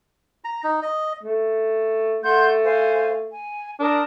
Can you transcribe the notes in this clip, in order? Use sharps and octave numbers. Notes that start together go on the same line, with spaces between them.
A#5
D#4
D#5
A3
A3 F#5 C6 G6
C5 F5 G#5
G#5
D4 A#4 A5 D#6